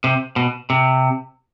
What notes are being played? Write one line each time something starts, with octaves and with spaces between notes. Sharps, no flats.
C3
B2
C3